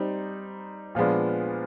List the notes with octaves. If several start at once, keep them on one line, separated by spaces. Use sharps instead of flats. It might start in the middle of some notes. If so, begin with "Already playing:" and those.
Already playing: G3 C4 D#4
A#2 F3 G#3 B3 D4